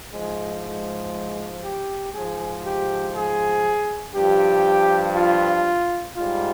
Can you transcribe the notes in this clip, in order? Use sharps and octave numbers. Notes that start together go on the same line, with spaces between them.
G#2 F3 G#3
G#3
G4
G#2 F3 G#4
G4
G#4
G2 F3 G4
F4
G#2 G3 F4